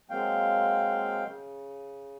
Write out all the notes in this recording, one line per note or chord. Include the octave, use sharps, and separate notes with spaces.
F#3 G#3 A#3 C4 F5 G5
C#3